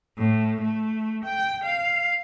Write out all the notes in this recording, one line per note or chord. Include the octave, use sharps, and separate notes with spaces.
A2
A3
G5
F5